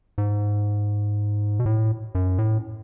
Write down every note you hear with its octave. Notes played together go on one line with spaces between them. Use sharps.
G#2
B2
A2
F#2
A2